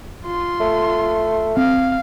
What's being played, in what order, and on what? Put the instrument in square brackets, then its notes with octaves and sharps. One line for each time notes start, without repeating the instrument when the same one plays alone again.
[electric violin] F4 C6
[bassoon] A3
[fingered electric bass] C4 [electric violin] F5